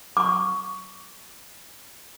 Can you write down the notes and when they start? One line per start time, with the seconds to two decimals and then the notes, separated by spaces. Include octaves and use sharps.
0.17 C#6 D6